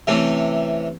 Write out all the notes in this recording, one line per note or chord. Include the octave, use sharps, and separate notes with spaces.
C3 E3 A3 C#4